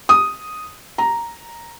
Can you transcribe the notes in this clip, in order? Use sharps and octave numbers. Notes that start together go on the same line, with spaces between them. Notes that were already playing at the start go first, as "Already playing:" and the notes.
D#6
A#5